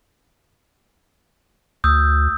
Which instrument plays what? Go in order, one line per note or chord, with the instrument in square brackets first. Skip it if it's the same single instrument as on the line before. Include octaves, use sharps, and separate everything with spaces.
[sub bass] D2 [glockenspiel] D#6 E6 G6